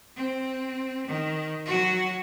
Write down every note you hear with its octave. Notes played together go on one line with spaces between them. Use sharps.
C4
D#3
F#3 F#4